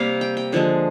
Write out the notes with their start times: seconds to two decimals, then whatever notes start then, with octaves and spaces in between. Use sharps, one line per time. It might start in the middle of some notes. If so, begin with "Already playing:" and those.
Already playing: C3 G3 A#3 F5
0.21 G5
0.37 G5
0.52 D3 F3 G#3